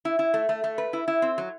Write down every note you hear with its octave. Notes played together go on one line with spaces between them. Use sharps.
E4
E4
A3
A3
A3
B4
E4
E4
C4
F#3